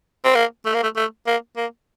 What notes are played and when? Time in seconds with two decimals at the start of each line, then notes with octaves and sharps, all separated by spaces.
0.25 C4
0.35 A#3
0.66 A3
0.74 A#3
0.83 A3
0.96 A3
1.27 A#3
1.57 A#3